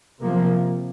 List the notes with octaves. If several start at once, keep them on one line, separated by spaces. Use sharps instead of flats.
C3 F3 A#3